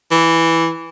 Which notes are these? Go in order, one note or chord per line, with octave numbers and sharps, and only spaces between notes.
E3